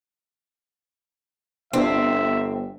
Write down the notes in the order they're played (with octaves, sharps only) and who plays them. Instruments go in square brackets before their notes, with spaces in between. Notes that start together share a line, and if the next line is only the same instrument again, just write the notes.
[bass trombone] G1 [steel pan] B3 D4 F4 [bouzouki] C4 [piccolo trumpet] E5